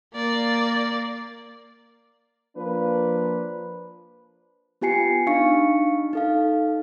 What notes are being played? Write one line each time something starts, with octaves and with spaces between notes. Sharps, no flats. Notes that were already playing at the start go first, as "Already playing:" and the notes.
A#3 D5
F3 A#3 D4 B4
B3 F4 G4 G#5 C7 C#7
D4 D#4 F5 C#6 C#7
D#4 A4 F5